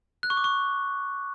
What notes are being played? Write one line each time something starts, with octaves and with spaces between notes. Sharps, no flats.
F#6
C#6
D6
C#6